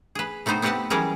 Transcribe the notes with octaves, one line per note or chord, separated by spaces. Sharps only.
G#4 B4
C3 A3 B3 D#4 C5
B3 C4 G4 B4 F#5 A5
E3 F#3 G3 C#4 G#4 A#4